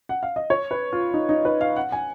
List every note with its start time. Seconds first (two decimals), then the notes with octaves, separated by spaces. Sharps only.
0.09 F#5
0.23 F5
0.36 D#5
0.50 C#5
0.71 B4
0.93 F4
1.14 D#4
1.29 D#4
1.45 B4
1.61 F5
1.76 F#5
1.92 G#5